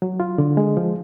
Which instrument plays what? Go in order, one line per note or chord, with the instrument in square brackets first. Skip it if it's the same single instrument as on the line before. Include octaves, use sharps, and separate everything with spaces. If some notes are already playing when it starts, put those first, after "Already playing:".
[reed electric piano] F#3
F4
D3
G#3
F3